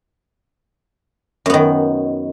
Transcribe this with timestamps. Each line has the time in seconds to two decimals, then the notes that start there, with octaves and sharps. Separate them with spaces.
1.46 F#2
1.50 B3
1.54 D#3